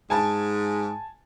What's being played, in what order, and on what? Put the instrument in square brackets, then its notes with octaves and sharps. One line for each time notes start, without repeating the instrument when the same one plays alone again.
[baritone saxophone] G#2 [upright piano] G#5 A5